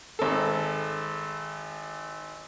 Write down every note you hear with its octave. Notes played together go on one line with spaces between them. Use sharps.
G#1 A4